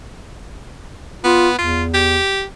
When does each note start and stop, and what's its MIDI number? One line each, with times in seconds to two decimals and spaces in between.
1.24 1.56 59
1.24 1.49 65
1.58 2.18 40
1.58 1.83 65
1.94 2.43 67